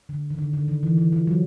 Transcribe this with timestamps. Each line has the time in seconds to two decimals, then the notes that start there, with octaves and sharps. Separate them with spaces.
0.09 D3
0.30 D#3
0.38 D3
0.53 D3
0.68 D#3
0.83 E3
0.98 E3
1.12 F3
1.27 F#3